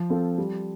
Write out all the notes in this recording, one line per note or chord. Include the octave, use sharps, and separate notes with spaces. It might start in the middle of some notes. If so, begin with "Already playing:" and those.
Already playing: F3
C4 F4 A4
G3